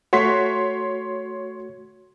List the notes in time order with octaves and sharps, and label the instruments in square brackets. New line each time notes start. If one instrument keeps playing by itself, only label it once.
[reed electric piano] A3 F#4 [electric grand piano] C#5 C6 B6